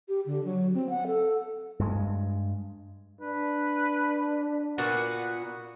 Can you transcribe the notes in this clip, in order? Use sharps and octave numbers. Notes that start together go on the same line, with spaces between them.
G4
D3
F#3
C4
F#5
A4
G2 G#3
D4 B4
A#2 B3 F#4 F#5